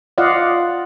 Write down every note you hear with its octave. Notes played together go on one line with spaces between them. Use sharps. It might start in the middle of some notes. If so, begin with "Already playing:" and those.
F4 D5 D#5 F5 F#5